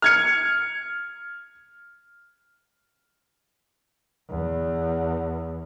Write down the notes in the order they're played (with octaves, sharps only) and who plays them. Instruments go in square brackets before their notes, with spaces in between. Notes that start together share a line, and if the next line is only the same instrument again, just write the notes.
[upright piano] F6 G#6 C#7
[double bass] E2